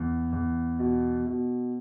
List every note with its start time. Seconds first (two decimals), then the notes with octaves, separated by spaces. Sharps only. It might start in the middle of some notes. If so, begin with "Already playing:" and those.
Already playing: E2
0.32 E2
0.79 B2
1.26 B2